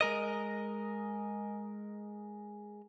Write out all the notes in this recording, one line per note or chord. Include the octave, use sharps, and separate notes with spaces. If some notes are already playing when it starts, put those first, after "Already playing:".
G#3 A#4 D#5